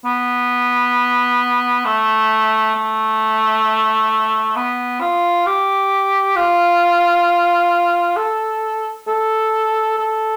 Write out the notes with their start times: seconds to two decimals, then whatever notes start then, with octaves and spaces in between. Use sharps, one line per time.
0.05 B3
1.85 A3
2.75 A3
4.56 B3
5.00 F4
5.46 G4
6.36 F4
8.16 A4
9.07 A4
9.98 A4